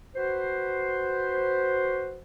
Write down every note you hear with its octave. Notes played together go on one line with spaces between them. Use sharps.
F#4 B4 C5